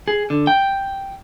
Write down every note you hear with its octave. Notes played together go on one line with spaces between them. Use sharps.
G#4
D3
G5